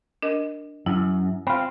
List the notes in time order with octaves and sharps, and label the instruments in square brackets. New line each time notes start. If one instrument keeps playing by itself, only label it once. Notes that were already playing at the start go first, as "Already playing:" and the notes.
[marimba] D4 A#4 D#5
[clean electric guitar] F#2 [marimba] E4
[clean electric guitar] C4 F4 [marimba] B5